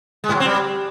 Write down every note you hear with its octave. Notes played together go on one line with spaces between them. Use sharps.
G#3
G#2
F#3
C4
G3